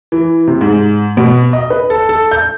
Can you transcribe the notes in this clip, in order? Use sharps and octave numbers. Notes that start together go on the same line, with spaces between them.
E3
C3
G#2
B2
D#5
B4
A4
A4
G6